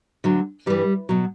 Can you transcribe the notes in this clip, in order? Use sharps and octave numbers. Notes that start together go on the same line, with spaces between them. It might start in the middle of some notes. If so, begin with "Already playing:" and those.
D2 D3 F#3
G2 E3 G3
B2 F#3